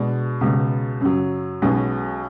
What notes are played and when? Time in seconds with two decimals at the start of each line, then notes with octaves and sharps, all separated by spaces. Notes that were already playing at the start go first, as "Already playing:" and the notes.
Already playing: B2 G#3 D4
0.41 C#2 B2 G#3
1.01 F#2 C#3 F#3
1.62 B1 B2 G#3 C#4